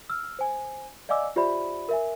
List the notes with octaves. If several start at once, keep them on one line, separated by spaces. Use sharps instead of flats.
E6 F6
C5 G#5
D5 D#5 F5 G#5 D6 E6
F4 G4 C5 D5 E5 B5
A#4 E5 G#5